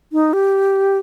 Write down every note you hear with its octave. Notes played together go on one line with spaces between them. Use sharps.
D#4
G4